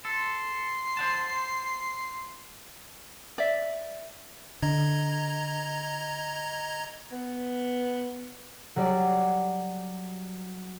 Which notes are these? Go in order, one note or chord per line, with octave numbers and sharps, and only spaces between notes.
A4 C6
C5 F#5 A5
D5 E5
D3 D#5 A#5 G#6
B3
F#3 G3 D5